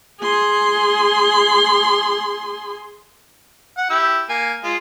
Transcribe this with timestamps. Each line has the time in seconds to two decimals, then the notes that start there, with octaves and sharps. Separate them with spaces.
0.21 G#4 C6
3.77 F#5
3.90 E4 G4 E6
4.29 A#3 G#5
4.64 G#3 F4